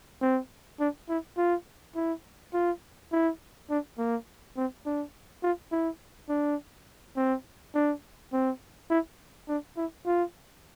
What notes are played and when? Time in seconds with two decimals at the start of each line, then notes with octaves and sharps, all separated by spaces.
0.22 C4
0.80 D4
1.09 E4
1.37 F4
1.95 E4
2.53 F4
3.12 E4
3.70 D4
3.98 A#3
4.57 C4
4.86 D4
5.43 F4
5.72 E4
6.29 D4
7.17 C4
7.75 D4
8.33 C4
8.90 E4
9.48 D4
9.77 E4
10.06 F4